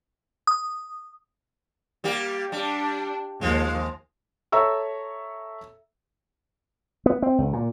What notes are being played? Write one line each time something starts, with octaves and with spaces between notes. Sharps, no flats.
D#6
G3 A#3 G4
G3 D4
D#2 F3 G#3
A4 C#5 E5 A#5 C#6 E6
B3
C4
C#2
A#2